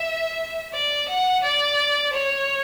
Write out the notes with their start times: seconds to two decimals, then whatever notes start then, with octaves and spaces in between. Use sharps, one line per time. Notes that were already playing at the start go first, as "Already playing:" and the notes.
Already playing: E5
0.73 D5
1.08 F#5
1.43 D5
2.12 C#5